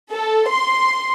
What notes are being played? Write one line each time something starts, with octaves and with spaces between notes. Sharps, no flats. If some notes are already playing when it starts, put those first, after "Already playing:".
A4
C6